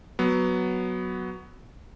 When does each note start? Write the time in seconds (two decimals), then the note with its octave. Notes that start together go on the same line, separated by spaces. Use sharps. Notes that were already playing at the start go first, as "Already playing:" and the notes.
0.19 F#3 B3